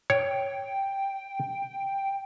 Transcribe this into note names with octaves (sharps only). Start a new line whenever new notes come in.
C#5 G5